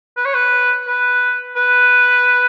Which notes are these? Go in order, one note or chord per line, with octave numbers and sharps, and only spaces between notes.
B4
C#5
B4
B4
B4